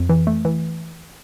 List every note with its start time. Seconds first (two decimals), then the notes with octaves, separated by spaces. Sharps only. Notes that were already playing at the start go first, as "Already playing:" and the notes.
Already playing: F2
0.09 E3
0.27 A3
0.45 E3